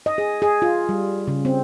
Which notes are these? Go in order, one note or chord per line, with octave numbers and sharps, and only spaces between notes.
D#5
G#4
G#4
F4
G3
C#3
C4